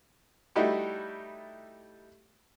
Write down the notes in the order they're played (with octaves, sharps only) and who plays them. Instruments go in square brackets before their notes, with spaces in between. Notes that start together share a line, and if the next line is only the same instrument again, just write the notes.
[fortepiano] G3 A3 D#4 E4 F#4 G4